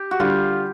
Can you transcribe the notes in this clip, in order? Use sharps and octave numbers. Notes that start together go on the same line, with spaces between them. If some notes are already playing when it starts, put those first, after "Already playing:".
Already playing: G4
F#4
D3 G3 F4